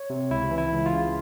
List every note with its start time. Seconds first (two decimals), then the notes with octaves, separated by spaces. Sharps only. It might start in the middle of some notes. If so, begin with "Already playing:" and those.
Already playing: C#5
0.10 C3
0.31 C#2 E4
0.51 E3
0.58 E4
0.72 C#2
0.86 F4
0.93 C#3